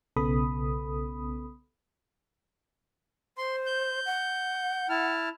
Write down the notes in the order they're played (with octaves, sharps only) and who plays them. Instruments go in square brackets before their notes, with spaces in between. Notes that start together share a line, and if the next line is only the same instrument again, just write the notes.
[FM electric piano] B1 C#3 B3 A4 B5 D#6
[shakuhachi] C5 [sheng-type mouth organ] C6
[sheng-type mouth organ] G6
[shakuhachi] F#5
[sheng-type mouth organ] E4 A5 F6